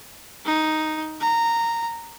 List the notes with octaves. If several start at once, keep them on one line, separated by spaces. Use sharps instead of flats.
D#4
A#5